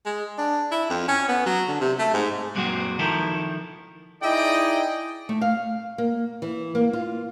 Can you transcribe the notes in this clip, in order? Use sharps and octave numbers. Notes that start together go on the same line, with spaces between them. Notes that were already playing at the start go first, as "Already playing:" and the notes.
G#3
D4
E4
F2
C#4
B3
F#3
D3
C3
A3
G#2
F#2 A#2 F#3 G#3 C4 F#4
D#3 F3 E4 A4 A#4
D#4 E4 G#4 D5 D#5 G5
A3
F5
A#3
E3
A#3
F4